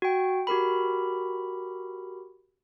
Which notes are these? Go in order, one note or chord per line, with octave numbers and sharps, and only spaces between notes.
F#4 G5
F#4 G4 A#4 B5